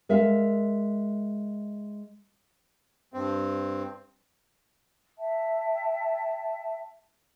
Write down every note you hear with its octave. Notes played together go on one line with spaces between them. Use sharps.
G#3 A#4 E5 F5
G2 C4
E5 G5 A5